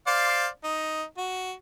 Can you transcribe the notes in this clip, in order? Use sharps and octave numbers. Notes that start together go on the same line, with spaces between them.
C5 D5 F5
D#4
F#4